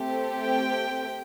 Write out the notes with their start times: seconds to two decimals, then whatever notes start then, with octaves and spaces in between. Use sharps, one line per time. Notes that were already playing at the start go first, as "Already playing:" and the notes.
Already playing: A3 C4 G4
0.42 G5